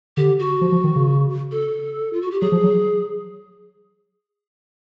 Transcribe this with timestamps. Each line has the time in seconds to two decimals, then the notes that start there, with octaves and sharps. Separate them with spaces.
0.17 D3 G4
0.39 F#4
0.61 F3
0.72 F3
0.84 D#3
0.96 C#3
1.51 A4
2.13 F4
2.22 F#4
2.31 G4
2.41 F#3 G#4
2.52 F3
2.64 F#3